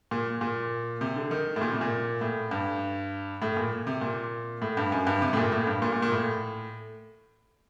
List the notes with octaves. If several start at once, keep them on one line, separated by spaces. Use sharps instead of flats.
A#2
A#2
C3
D3
D#3
A2
A#2
C3
A#2
A2
G2
A2
A#2
C3
A#2
A2
G2
F#2
G2
C3
A2
A#2
A2
G2
A#2
A#2
A#2
A2